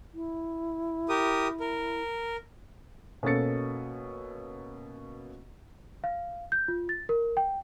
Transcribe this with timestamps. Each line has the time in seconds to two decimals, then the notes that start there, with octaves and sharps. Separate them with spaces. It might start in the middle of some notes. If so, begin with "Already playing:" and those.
0.14 E4
1.09 G4 A#4 D#6
1.60 A#4
3.23 B2 A#3 C#4 A4 A6 C#7
6.04 F5
6.52 G6
6.68 F4
6.89 A6
7.09 A#4
7.37 G5